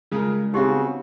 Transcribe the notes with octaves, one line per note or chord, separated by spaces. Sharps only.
C#3 G3 G#3 F4 A#4
C#3 B3 C4 D#4 F#4 G4 C6